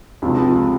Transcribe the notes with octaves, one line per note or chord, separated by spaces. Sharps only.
C#2 C3 F3